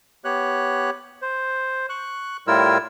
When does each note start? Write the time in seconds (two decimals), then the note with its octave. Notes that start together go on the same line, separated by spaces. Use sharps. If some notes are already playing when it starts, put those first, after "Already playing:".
0.25 B3 G4 C#5 F#6
1.22 C5
1.89 C#6 F#6
2.47 A2 G3 E4 F4 A#4 E6